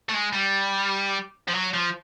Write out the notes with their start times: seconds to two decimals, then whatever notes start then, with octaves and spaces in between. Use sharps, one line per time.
0.09 A3
0.14 G#3
0.33 G3
1.48 F3
1.54 F#3
1.74 F3